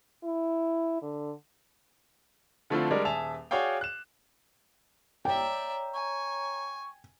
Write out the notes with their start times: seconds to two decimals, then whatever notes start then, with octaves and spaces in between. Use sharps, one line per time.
0.23 E4
1.02 D3
2.70 D3 F3 A3 C4 E4 F4
2.91 G3 G#3 D4 A#4 D5
3.05 D#1 G#4 E5 G#5 A5 F7
3.51 F#4 G#4 C#5 D5 F5 G5
3.81 F#6 E7
5.25 C#5 D5 E5 G5 A#5
5.94 G#5 C#6